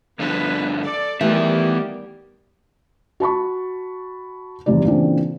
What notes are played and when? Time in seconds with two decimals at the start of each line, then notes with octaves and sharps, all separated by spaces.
0.19 G2 D3 F3 B3 B4
0.83 A4 D5
1.21 D#3 E3 G3 A3 B3 G4 E5
3.20 F#4 A5 B5 C#6
4.66 E2 C3 D#3 G3 D5
4.85 A#2 C#3 E3 C4 D4